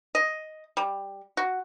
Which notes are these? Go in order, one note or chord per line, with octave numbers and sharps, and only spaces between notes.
D#5
G3
F#4